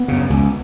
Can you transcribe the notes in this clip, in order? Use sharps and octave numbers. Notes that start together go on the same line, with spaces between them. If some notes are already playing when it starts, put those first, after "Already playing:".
Already playing: B3
F#2 C#3
C#2